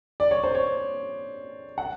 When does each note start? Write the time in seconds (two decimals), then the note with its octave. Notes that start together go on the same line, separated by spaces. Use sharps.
0.20 D5
0.31 C#5
0.44 C5
0.55 C#5
1.78 F#5